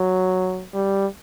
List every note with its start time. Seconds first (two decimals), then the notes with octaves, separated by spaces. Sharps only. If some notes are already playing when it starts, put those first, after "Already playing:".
Already playing: F#3
0.74 G3